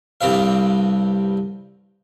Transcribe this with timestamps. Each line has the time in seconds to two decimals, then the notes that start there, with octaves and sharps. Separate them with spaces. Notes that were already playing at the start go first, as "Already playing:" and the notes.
0.21 C2 G2 C4 B4 F5